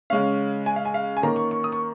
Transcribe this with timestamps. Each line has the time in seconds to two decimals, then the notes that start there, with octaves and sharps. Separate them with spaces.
0.10 C#3 G#3 C#4 F5
0.66 G#5
0.76 F5
0.85 G#5
0.94 F5
1.17 G#5
1.22 D#3 A#3 C#4 A#5
1.36 C#6
1.51 C#6
1.64 D#6
1.72 C#6